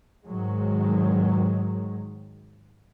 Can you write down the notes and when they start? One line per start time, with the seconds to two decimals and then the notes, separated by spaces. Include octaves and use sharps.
0.25 G#2 D#3 F#3 G#3